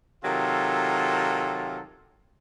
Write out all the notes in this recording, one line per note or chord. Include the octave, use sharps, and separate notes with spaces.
C3 D#3 F#3 F4 A4